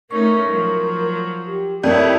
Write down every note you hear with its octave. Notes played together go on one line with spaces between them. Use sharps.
A3 C#4 D#4 A#4 C#6
F3 F#3 A#4
G4
F2 E4 G4 A#4 C#5 D5